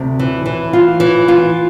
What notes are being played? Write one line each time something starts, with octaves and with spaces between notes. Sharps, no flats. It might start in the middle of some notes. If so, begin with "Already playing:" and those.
Already playing: D2 C3
E3
E3
F4
E3
F4